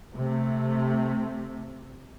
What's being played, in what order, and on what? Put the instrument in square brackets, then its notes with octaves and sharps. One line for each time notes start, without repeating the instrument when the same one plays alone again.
[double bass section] C3 A3